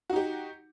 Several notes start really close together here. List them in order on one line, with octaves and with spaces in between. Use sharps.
F#4 D#4 G4